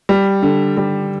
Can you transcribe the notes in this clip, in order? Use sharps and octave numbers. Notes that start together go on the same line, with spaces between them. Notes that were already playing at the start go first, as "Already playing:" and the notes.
G3
D3
G3